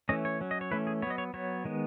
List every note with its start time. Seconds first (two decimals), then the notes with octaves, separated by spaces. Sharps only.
0.09 E3 A3 C#4 D#5
0.25 C#5
0.41 F#3 C#4
0.51 D#5
0.61 C#5
0.71 E3 A3 C#4 B4
0.87 G#4
1.02 B3 C#5
1.07 F#3 D#5
1.18 C#5
1.34 F#3 B3 C#5
1.65 D#3 G#3 B3